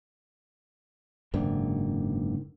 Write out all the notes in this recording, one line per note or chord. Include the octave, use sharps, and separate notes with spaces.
F#1 G#2 D3 D#3